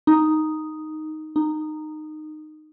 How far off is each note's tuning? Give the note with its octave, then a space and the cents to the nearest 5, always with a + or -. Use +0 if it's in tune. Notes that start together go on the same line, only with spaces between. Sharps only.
D#4 +0
D#4 -15